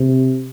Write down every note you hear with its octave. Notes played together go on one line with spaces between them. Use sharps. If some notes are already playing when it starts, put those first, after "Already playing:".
Already playing: C3